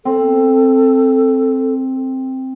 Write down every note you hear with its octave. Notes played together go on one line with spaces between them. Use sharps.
C4 A4